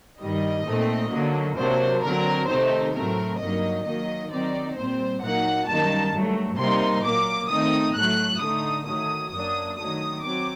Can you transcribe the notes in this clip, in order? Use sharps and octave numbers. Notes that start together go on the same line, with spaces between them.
G2 D#3 G3 D#5
A#2 A3 C4 D#4
D3 F#3 A#3
C3 F#3 A#3 D4 C5
D3 F#3 C4 A#4
C3 D#3 A3 C4 D#4 C5
A2 F#3 A3 C4 A#4
G2 F#3 A#3 D#4 D#5
D#3 F#3 A#3 D#5
D#3 F#3 C4 D#4 D5
A#2 G3 C4 C5
A#2 F#3 A#3 D#4 F#5
F#2 D#3 G3 A#3 D#4 A5
G2 F#3 A3
C3 G3 A#3 D#4 C6
A#2 F#3 A#3 D6
D#3 A3 C4 D#4 D#6
A2 F#3 A3 F#6
D3 A3 D#4 D#6
D#3 F#3 A3 D#6
F#2 F#3 A#3 D4 D#6
D#3 F#3 A3 D#6
F#3 C4 D6